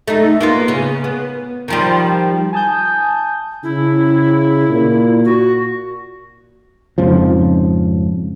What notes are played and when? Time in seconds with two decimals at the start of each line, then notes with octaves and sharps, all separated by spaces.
0.08 A3 D#4
0.41 A#3 B3 F4
0.68 C#3 B3
1.04 B3
1.68 D#3 F3 G3
2.53 G#5 A5 D#6 G6
3.63 C#3 E4
4.69 A#2
5.25 F#4
6.98 F2 G#2 C#3 F3